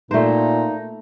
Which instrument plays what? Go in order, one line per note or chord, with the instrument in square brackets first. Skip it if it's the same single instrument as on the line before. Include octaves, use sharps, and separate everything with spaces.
[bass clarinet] A#2 [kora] A3 C5 [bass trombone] A#3 [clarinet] D#4